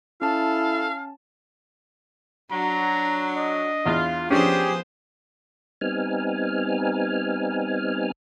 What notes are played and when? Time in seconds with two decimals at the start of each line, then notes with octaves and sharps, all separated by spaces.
0.22 C#4 E4 A4 F5 A5
2.51 F#3 D4 A#5
3.37 D#5
3.86 E2 F4
4.30 F3 B3 C#4 D4 G4 G#4 C5
5.81 G3 B3 C4 D#4 G#5 F6